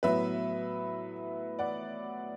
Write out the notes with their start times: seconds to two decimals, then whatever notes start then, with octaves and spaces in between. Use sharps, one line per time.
0.03 A2 F#3 B3 B4 E5
1.59 D5 F#5